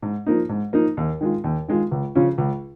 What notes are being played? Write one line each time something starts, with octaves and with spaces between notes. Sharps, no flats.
G#2
F3 A#3 D#4
G#2
F3 A#3 D#4
D#2
D#3 G#3 F4
D#2
D#3 G#3 F4
C#2
C#3 F3 C#4 F4
C#2